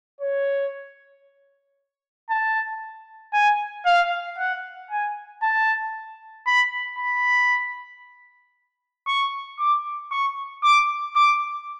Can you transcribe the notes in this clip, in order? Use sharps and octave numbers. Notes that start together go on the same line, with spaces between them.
C#5
A5
G#5
F5
F#5
G#5
A5
B5
B5
C#6
D6
C#6
D6
D6